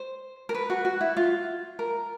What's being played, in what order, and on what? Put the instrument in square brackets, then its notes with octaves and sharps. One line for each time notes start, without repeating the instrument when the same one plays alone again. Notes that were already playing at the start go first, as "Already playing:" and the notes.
Already playing: [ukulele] C5
A#4
B4
F#4
F#4
E4
F4
A#4